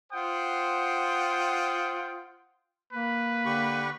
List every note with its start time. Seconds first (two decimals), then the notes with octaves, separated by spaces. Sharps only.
0.12 F4 C5 F#5 G5 D#6
2.93 A#3 B4
3.45 D3 G4 C#6